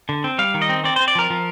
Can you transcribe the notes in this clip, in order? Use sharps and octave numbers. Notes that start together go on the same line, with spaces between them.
D3
C4
G3 F5
D#3
D#5
C4
C4 D5
C4 C5
D5
F3 A#4
F3